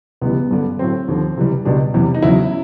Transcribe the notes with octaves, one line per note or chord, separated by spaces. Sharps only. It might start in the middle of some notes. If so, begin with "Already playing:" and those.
C#2 C#3 E3 G3 B3
G2 D3 G3
A2 F#3 C4
D#2 D3 F3
C#2 C3 E3 G3
C#2 B2 G3 D4
E2 C3 E3 G3
D#4
E2 C#3 F#3 E4